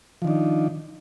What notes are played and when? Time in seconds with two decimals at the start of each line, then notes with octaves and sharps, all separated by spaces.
0.22 F3
0.25 D#3
0.27 D4
0.30 D#4